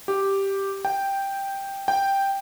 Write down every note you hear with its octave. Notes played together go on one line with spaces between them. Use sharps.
G4
G5
G5